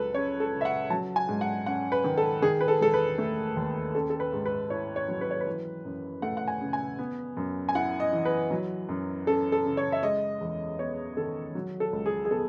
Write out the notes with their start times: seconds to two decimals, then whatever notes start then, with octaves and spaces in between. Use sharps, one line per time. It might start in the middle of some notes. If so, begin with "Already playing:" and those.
Already playing: C#2 F#3 A4 B4
0.14 C#4 C#5
0.40 A4
0.52 C#3
0.61 E5
0.65 F#5
0.90 F#3 A5
1.16 G#5
1.28 G#2
1.41 F#5
1.66 C#4 F#5
1.92 B4
2.04 D#3
2.17 A4
2.42 D#3 G#4
2.61 B4
2.68 A4
2.81 E1 A4
2.94 B4
3.18 A3
3.57 D#2
3.95 C#4 A4
4.10 A4
4.20 B4
4.33 G#2
4.46 B4
4.70 E4 C#5
4.96 C#5
5.08 F#3
5.21 B4
5.31 C#5
5.41 B4
5.46 E3
5.85 F#2
6.22 A3 F#5
6.37 F#5
6.48 G#5
6.61 C#3
6.73 G#5
6.99 B3
7.37 F#2
7.69 G#5
7.75 E4 F#5
8.00 D#5
8.13 E3
8.25 B4
8.51 F#3
8.89 F#2
9.27 C#4 A4
9.52 A4
9.65 C#3
9.77 C#5
9.92 E5
10.03 G#3 D#5
10.41 E2
10.79 B3 C#5
11.17 D#3 A4
11.55 F#3
11.80 A4
11.93 C#2
12.06 G#4
12.25 G#4
12.31 B3 A4